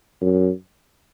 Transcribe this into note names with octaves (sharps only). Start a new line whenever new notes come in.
F#2